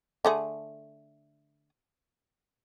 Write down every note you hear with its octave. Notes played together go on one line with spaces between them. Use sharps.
D3 A3 G#4